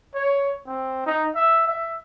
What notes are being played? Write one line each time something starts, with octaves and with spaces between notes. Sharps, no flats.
C#5
C4
D#4
E5
E5